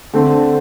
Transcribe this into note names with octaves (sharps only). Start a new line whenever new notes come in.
D3 A3 C4